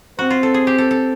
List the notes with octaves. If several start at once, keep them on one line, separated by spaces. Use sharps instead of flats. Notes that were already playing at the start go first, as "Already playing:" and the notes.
C4 F#4
F4
A4
G#4
G4
A4
A4